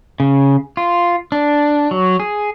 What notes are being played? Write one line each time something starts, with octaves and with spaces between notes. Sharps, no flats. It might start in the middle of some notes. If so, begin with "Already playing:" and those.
C#3
F4
D4
F#3
G#4